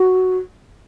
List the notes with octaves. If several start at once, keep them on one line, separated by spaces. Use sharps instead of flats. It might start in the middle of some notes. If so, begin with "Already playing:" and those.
Already playing: F#4